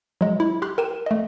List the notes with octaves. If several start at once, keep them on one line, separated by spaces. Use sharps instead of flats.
F#3 G#3
E4
G4 C6 F#6
A#4 G5 D#7 E7
A3 D#5